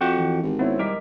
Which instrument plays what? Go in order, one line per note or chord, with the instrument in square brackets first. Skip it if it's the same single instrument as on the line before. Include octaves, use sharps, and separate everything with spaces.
[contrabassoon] F2 [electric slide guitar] F#4 G5
[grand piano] E3
[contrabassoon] G#1 [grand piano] G4
[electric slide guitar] B3 [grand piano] C4 E4 C#5
[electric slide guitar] G3 A#4 [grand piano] D#5 D6 B6